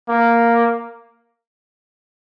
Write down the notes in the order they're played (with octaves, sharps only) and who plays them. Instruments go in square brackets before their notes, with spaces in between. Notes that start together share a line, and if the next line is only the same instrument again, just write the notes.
[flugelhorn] A#3